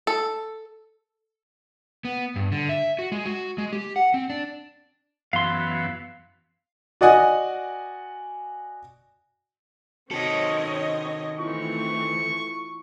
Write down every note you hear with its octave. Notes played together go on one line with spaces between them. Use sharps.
A4
B3
G2
D3
E5
F#4
G#3
F#4
G#3
G4
F#5
C4
D4
F#2 E3 B3 F5 C6
F#4 D5 D#5 F#5 G#5
D#3 C4 F#4 A4 C#5 D#5
E3 A3 C4 E4 F4 C#6